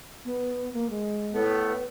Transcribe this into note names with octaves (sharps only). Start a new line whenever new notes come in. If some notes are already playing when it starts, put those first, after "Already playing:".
B3
A#3
G#3
A2 A3 B3
B4